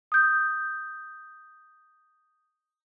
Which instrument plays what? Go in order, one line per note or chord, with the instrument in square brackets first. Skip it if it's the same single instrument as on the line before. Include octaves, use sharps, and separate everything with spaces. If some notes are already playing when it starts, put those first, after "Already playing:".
[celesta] D#6 G6